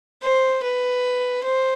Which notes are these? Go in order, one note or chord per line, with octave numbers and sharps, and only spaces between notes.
C5
B4
C5